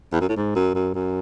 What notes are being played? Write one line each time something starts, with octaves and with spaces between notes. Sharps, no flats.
E2
F#2
A2
G#2
F#2
F#2
F#2